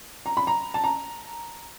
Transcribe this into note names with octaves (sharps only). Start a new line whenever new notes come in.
A#5
B5
A#5
A5
A#5